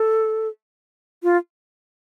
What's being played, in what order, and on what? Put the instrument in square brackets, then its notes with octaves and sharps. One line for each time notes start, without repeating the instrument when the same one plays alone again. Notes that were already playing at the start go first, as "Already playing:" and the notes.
Already playing: [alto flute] A4
F4